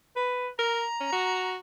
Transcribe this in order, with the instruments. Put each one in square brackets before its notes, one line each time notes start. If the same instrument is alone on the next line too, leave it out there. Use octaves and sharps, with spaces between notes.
[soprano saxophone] B4
[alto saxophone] A#4 [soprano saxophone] A#5
[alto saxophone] C#4
F#4